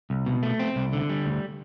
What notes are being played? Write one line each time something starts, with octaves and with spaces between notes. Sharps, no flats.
C2
B2
A3
C4
C2
D3
G3
D2